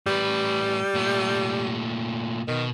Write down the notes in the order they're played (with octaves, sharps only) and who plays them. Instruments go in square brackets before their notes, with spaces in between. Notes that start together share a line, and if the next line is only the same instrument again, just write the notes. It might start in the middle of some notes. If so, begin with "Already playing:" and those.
[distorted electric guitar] A2 B4 [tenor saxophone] G3
[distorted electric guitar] A#2 A3
[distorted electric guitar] B2 [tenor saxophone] D#3